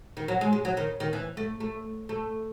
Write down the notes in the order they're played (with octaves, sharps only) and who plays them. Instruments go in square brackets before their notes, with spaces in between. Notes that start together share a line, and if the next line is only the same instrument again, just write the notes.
[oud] D#3
F#3
G#3
G#3
F#3
D#3
D#3
E3
A3
A3
A3